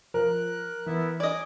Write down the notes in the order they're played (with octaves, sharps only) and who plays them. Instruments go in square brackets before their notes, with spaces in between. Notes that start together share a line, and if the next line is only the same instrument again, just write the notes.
[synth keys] F3 [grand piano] A#4 [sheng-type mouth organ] F#6
[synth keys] E3 [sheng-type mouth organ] B3 E4 E5
[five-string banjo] D5 D#5 [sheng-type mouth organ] G#5 D6